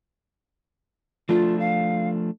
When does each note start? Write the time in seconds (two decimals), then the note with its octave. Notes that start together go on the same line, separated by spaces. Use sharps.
1.29 F3 A3 D4 F4
1.59 F5